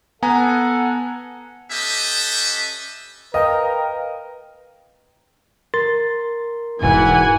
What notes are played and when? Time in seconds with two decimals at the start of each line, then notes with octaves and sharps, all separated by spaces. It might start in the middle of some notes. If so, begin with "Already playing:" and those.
0.23 B3 A4 F#5 G#5 A#5
1.71 C#4 G4 A4 B4 D#5 E5
3.34 A#4 B4 D#5 F5 G5
5.74 A#4 C6 A6
6.82 E1 G#2 B2 E3 F#5 G#5